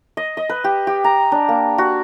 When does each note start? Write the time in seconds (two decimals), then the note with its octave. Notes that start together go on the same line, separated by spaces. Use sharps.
0.17 D#5
0.37 D#5
0.49 B4
0.64 G4
0.87 G4
1.04 A#5
1.32 D4
1.48 A#3
1.78 F#4